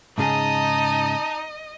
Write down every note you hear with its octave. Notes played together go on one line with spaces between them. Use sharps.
G#2 C#3 D#4 G#4 D#5 A5